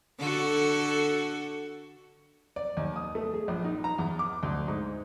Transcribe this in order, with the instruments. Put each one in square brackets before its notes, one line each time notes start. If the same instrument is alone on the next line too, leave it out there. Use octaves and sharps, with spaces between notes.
[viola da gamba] D3 F#4 A4
[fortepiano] D5
D#2
D#6
A3
G#4
A#1
D#4
A#5
E2
D6
D2
G#2